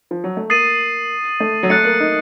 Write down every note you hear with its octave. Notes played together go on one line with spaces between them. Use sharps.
F3
F#3
A3
A#3 D#6 A6 C7 D#7
A3
F#3
A3 F#6 A6 C#7
A#3
D#4